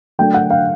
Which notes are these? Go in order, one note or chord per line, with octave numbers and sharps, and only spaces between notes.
F#3 A3 D4 G5
F#5
F5